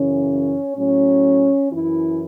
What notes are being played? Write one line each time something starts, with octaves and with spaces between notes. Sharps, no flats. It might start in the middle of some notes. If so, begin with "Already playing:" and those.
Already playing: F#2 C#3 E3 C#4
A2 F#3 C#4
F#2 E3 E4